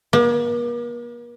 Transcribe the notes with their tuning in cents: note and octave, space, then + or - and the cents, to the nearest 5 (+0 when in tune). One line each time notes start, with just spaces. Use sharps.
A#3 +45